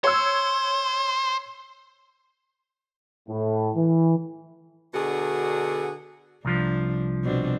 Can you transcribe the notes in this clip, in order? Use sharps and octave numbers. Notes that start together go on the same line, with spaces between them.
C5 C#5 E6
A2
E3
B2 D3 D4 F#4 G#4
C2 F3 D4
B2 C4 D4